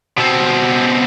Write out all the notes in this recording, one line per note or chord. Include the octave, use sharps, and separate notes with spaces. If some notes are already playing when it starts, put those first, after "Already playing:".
B2 C4